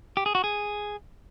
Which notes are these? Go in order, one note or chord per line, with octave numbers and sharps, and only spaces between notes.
G4
G#4
F#4
G#4